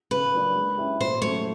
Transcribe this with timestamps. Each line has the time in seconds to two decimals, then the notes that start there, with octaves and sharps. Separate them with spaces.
0.11 C#3 B4
0.34 F#3 A#3 D4
0.56 G#3
0.77 C#4 E4 G4
1.00 A#2 C5
1.22 F#3 A3 C#4 C#5